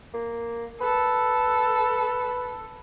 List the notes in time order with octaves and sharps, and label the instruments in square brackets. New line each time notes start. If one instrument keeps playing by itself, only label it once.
[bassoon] A#3
[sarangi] A4 [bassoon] B4